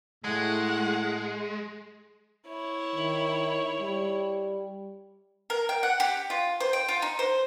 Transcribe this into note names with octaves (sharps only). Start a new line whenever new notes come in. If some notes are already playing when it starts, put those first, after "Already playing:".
A2 G#3 F#5
E4 C#5
D#3
G3
A#4
G5
F#5
G4
F4
C5
G5
F4
D#4
C5